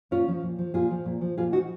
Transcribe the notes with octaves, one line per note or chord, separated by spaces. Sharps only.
A#2 C#4 F4
F3
A#2
F3
A#2 F4 G#4
F3
A#2
F3
A#2 F4 G#4
F3 D#4 F#4